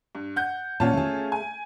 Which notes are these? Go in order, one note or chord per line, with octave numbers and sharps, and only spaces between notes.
G2
F#5 G6
A#2 C#4 F4 F#5 A5
A3 G#4
G#5